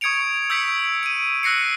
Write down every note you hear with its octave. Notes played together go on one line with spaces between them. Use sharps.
C#6 D#6 G#6 C#7 D7 F7
E6 G6 G#6 B6 C#7 D7
D7 D#7
E6 F#6 A#6 C7 C#7